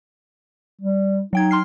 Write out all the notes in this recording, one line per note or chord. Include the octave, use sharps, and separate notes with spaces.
G3
F#3 D#4 G5 G#6
C6 F6 C7